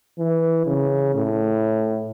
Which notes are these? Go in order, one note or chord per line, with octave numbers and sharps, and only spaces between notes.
E3
C#3
A2